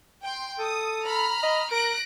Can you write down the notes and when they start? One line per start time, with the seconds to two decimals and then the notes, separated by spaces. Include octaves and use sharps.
0.24 G5 C6
0.59 A4 D#6
1.04 A#5 B5 F6
1.43 D#5
1.71 A#4 F#6 A#6 D7